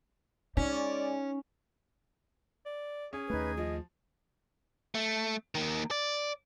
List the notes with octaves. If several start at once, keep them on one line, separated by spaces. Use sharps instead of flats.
G#3 C#4 D#4 D5
D5
C#4 G#4
D#2 A3 D#4 B4 G#6
F3 D#5
A3
D#3 A#3
D5